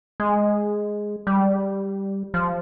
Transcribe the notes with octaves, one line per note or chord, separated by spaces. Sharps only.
G#3
G3
F3